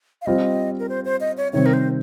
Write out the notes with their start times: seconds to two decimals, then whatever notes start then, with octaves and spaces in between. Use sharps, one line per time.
0.22 F5
0.26 G3 C4 F4 D#5
0.79 A#4
0.89 C5
1.05 C5
1.21 D#5
1.37 C#5
1.53 C3 D#3 G3 C4 C#5
1.66 A#4
1.73 C5